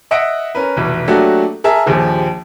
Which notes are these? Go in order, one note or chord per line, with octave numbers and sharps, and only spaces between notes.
D#5 E5 F#5 A#6 D7
C#4 A#4 B4
F1 B1 E3
F#3 A3 A#3 D4 F#4 G4
G#4 A#4 E5 A5
A#1 D#2 F3 G4 G#4